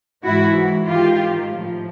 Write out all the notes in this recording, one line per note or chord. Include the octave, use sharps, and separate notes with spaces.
G#2 E3 E4 F#4
G#2 D#3 F4 G4
A2 F3